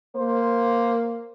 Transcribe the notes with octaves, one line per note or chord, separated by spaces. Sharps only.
A#3 C5